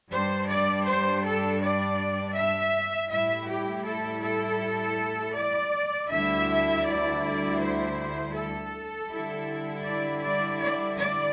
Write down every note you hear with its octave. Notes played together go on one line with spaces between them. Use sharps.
G2 G3 D4 C5
D5
C5
A4
D5
E5
A2 G3 E4 E5
G4
A4
A4
D5
D2 D3 G3 E4 E5
D5
C5
A4
D3 G3 E4
D5
D5
D5
D5